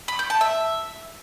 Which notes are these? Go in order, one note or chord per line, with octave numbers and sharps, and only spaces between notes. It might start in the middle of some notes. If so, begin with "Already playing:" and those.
B5
G6
A5
E5